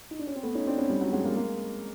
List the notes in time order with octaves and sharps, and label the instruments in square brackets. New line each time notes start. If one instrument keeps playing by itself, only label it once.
[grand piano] D#4
D4
C#4
C4
A3 B3
C#4 D#4
C4 D4
B3 C#4
G3
F#3
F#3 G#3
G#3 A#3
G#3 A#3